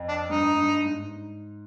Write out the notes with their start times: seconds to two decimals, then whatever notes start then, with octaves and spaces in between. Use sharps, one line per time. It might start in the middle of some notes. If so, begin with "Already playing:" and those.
Already playing: F2
0.08 D4
0.29 G2 D#4
0.57 G2
0.85 G#2